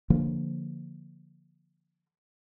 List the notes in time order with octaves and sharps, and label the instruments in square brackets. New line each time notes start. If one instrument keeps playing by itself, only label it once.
[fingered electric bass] D3 F3 A#3